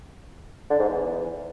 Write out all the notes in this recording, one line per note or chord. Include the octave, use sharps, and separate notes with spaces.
D3
G#2
E2